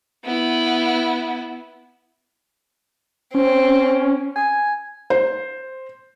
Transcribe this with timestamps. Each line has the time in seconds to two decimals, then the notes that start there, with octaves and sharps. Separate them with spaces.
0.25 B3 E4
3.35 C4 C#4
4.36 G#5
5.10 C5